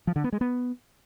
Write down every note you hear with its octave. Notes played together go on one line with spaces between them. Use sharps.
F3
D3
B3
G#3
B3